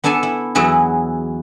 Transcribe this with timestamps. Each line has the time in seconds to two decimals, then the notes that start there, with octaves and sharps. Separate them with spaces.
0.04 B3 D4 A4 G#5 A5
0.23 E4
0.55 E2 E3 F#3 E4 G#4